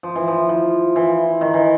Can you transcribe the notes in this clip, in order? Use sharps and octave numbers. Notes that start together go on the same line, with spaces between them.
F3
E3
F3
F3
E3
D#3
E3